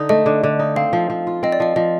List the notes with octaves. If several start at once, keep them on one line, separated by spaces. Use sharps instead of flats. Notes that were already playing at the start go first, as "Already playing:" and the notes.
Already playing: D3 D#4
A3 D#5
D3
D3
D#4
C4 F5
F3
F3
F4
C4 D#5
D5
F3 D#5
F3 D#5